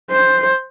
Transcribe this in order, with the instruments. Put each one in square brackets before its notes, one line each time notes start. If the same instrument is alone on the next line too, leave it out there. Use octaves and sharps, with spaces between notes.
[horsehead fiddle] C5